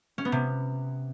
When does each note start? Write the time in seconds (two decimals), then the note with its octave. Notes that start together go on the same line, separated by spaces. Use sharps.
0.18 C#4
0.25 B3
0.32 C3